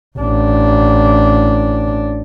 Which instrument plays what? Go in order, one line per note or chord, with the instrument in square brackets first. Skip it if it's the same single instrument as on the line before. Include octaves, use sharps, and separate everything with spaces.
[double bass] A1 D4